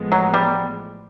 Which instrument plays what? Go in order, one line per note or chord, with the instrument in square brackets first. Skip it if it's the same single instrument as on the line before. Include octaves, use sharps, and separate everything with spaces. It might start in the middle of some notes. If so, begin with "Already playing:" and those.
Already playing: [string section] A1 A2 F3 G#3 B3
[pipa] F#3
G3